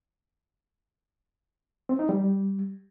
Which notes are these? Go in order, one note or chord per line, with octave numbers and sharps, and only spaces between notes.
C4
D#4
G3